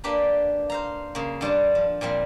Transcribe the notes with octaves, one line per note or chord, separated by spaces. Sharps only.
A#3 D4 G4 B4 A#5
C5 F5 A#5
C#3 A#3
G2 G3 C5 A5
F3
A#2 F3 G3 C4